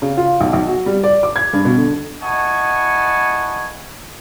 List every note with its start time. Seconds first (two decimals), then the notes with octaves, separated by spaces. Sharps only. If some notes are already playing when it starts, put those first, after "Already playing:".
0.02 C#3
0.17 F4
0.41 B1
0.53 B1
0.66 F#4
0.86 G3
1.03 D5
1.23 D6
1.36 G#6
1.53 G2
1.65 B2
1.77 D3
2.23 E4 D#5 F#5 G#5 A5 C#6